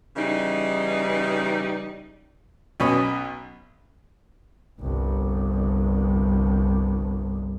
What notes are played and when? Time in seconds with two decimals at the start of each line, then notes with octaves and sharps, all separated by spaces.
0.17 C#3 E3 G3 D#4
2.80 B1 B2 C#4 B4 C#5 D#5
4.80 G1 C2